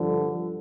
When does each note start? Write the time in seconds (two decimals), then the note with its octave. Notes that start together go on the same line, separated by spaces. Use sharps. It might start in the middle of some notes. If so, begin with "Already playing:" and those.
Already playing: G2 D3 F3